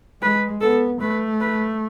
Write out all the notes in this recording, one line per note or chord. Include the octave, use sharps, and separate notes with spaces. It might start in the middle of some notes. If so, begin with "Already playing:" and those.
G#3 B4
B3 A4
A3 B4
B4